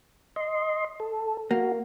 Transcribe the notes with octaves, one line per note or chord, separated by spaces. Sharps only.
D#5 C6
A4
A#3 F#4